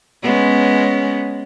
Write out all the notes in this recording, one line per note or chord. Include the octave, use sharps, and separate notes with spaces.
G#3 B3 C#4